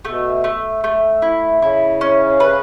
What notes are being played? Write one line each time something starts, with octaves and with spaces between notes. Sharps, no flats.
B2 A3
A3
A3
E4
C#3 E4
C#4
B4